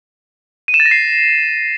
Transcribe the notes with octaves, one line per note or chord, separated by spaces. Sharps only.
D#7
E7
A6
A#6
C7